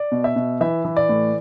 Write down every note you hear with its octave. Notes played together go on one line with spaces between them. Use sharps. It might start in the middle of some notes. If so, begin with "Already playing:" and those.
Already playing: D5
B2
E5
B2
E3 E5
E3
D5
A2